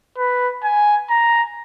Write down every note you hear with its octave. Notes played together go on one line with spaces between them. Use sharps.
B4
G#5
A#5